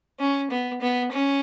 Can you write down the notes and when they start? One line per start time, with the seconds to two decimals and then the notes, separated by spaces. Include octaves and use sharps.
0.20 C#4
0.50 B3
0.81 B3
1.12 C#4